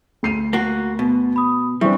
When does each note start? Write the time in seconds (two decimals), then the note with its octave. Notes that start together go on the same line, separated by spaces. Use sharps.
0.23 D2 C7 D#7
0.53 A#3 F#4
0.99 B2
1.36 B5 D#6
1.81 E3 G3 C4 D4 E5 C#6